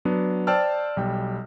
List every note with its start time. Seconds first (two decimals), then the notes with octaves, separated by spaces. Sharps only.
0.05 F#3 B3 D4
0.47 C5 D5 G5 A5 E6 F6
0.97 B1 G3 G5